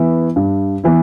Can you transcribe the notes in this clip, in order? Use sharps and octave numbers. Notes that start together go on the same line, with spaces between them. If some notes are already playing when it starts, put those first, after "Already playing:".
Already playing: E3 B3 E4
G2
E3 B3 E4